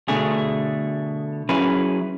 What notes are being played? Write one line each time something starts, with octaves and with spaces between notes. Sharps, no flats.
B2 D3 A3 G#4
F#3 C#4 E4 G#4 B4